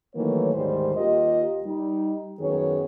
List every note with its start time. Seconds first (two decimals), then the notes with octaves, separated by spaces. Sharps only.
0.16 D#3 E3 F#3 A3 A#3 C#5
0.54 D2 G#2 D#3 G3 C5
0.95 D#2 F4 G4 A#4 D#5
1.64 G3 D#4
2.40 F#2 D#3 F#3 B3 G#4 C#5